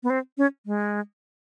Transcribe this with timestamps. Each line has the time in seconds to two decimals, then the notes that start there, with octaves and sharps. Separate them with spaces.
0.03 B3
0.10 C4
0.38 C#4
0.66 G#3